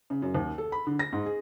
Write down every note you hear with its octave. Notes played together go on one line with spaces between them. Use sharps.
C#3
F#2
D#2
A4
B5
D3
A#6
G#2
G#4